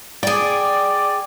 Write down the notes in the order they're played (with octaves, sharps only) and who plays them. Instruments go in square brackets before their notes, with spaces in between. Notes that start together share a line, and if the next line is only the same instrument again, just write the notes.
[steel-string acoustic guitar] G#4 G5 [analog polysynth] D5